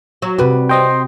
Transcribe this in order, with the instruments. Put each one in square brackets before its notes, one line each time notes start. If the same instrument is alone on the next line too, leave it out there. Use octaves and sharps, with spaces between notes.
[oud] F#3
[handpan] C3 F#4 [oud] G3 B4
[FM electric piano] C4 D#5 G5 [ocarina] C6